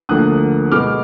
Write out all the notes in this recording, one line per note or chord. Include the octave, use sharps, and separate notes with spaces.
D2 D3 F3 A#3 D#6 F#6
B2 G#3 B3 D6 F6